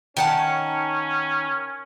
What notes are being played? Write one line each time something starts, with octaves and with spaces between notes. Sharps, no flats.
D#3 C#4 F#5 A5